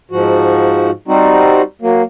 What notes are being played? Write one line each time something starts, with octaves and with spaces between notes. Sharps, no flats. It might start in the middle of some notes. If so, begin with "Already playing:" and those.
G#2 F3 F#4
G3 C4 D#4 F#4
F#3 A#3